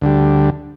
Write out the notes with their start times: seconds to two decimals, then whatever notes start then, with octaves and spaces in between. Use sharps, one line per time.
0.01 D2 D3 G3